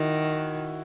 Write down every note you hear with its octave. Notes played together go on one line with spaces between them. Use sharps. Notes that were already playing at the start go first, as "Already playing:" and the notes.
Already playing: D#3 E4 F#4